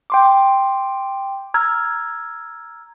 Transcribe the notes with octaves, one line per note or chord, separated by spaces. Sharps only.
G5 C6 D6
A#5 E6 F6 G#6